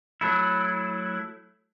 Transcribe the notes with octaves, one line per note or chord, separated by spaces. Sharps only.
F#3 A3 E4